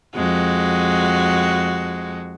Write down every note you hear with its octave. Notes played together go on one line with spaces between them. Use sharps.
F2 G#3 F#4